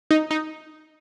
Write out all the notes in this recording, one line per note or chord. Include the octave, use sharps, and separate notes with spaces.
D#4
D#4